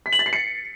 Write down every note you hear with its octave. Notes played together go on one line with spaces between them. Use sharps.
B6
F#7
A6
C7
C#7